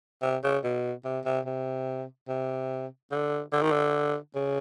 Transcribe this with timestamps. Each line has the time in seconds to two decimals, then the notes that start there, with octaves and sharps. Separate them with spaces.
0.22 C3
0.44 C#3
0.64 B2
1.05 C3
1.25 C3
1.46 C3
2.28 C3
3.12 D3
3.52 D3
3.62 D#3
3.72 D3
4.35 C#3